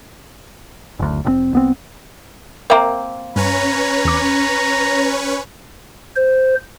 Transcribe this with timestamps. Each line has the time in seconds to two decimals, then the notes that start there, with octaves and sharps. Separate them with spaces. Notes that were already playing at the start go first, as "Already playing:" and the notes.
0.99 F#1 D2
1.25 F1 B2 C4
1.53 C2 B3 C4
2.70 A#3 C4 A#4 E5 A#5
3.36 G2 C#4 B4 C#5 A#5
4.05 E2 D6
6.16 C5